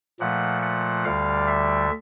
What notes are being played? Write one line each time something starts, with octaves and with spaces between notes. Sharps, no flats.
A#2 F3 A3 F#5
F#5
D2 D3 G3 F5
E5